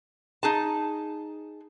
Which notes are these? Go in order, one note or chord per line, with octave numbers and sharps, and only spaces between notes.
D#4 G#4 A5